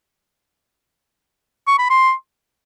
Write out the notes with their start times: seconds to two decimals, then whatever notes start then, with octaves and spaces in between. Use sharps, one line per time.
1.67 C#6
1.79 B5
1.90 C6